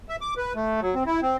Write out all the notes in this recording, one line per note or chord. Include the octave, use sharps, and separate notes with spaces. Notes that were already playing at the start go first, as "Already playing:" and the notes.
E5
D6
B4
A3
F#3
C4
E4
C4